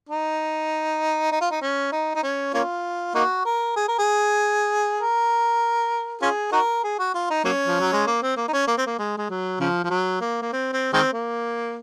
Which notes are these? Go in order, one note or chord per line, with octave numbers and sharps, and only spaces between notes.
D#4
D#4
F4
D#4
C#4
D#4
D#4
C#4
A#3 C#4 F4
A#3 D#4 F#4
A#4
G#4
A#4
G#4
A#4
C#4 F4 G#4
D#4 F#4 A#4
G#4
F#4
F4
D#4
F#3 A#3 C#4
F3
F#3
G#3
A#3
C4
A#3
D#4
C#4
A#3
C4
A#3
G#3
G#3
F#3
C#3 F3
F3
F#3
A#3
A#3
C4
C4
D#3 G#3 C4
A#3